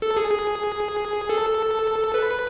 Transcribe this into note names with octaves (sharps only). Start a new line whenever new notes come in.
A4
G#4
G#4
A4
B4